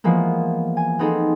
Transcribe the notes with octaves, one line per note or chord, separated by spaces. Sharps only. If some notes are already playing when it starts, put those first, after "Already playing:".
E3 F3 G#3 A#3 B3
G#5
B3 C4 D#4 G#4 A4